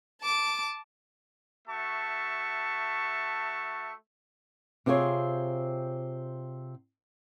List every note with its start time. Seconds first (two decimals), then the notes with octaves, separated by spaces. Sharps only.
0.22 A5 D6
1.68 A3 F#4 E5 A5 C#6
4.86 C3 C4 F4 G#4 C#5